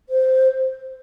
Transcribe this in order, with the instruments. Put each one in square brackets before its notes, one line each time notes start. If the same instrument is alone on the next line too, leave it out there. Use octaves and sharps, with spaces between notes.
[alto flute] C5